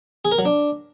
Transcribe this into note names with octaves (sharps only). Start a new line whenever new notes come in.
G#4
A#4
F#3
D4